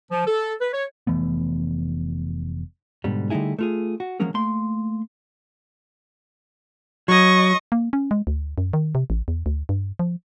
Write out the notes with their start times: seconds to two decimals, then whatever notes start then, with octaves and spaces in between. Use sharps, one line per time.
0.11 F3
0.26 A4
0.61 B4
0.74 C#5
1.07 F1 E3 A3 B3
3.04 G#2 B2 D3 G3
3.30 D3 G3 A3 D#4 E4 G#4
3.59 A3 F4 G#4
4.00 F#4
4.20 F3 F#3 G#3 A#3 C#4 G#4
4.34 A3 A#3 C6
7.08 F#3 D#5 C#6
7.72 A#3
7.93 C#4
8.11 G#3
8.27 D2
8.58 F#2
8.73 D#3
8.95 C3
9.10 A1
9.28 E2
9.46 D2
9.69 G2
9.99 F3